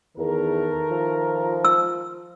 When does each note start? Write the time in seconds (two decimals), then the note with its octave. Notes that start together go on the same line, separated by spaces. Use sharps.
0.18 E2 D#3 A3 A#4
0.91 F3
1.65 E6